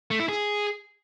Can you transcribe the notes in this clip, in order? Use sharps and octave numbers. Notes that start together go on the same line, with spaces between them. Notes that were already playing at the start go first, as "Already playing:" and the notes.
A3
E4
G#4